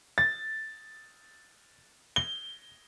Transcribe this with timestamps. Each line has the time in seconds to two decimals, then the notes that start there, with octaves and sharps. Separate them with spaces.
0.18 A6
2.16 G7